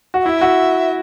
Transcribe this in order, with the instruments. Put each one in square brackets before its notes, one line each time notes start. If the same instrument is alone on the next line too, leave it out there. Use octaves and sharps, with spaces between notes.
[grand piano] F#4
[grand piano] E4 [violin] E5
[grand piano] F#4